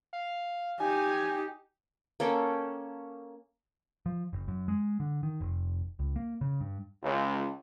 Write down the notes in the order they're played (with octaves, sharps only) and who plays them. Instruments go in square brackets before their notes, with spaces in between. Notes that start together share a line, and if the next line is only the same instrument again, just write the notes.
[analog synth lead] F5
[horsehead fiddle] D#4 G4 [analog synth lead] G#5
[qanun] A#3 C#4 A4 G5
[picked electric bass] F3
F#1
F#2
G#3
D3
D#3
F1
C#2
A#3
C#3
G2
[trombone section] C#2